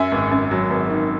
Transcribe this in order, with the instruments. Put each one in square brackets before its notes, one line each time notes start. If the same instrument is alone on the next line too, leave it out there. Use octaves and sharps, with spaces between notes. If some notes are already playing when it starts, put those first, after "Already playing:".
Already playing: [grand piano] F#2 E5 G#5
G#1
F#2
F#3
G#1
D#3